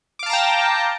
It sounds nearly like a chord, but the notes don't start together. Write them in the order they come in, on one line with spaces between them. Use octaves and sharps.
D6 F5 A5 A#5 G5